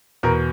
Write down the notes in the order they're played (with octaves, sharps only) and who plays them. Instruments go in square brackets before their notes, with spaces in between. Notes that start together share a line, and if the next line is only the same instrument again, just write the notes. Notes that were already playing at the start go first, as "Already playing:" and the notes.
[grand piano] E2 B2 A#4